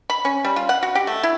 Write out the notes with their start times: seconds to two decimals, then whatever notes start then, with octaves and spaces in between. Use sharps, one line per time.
0.10 B5
0.25 C#4
0.45 G3
0.56 F4
0.69 F#5
0.83 F#4
0.95 G4
1.07 A3
1.23 E4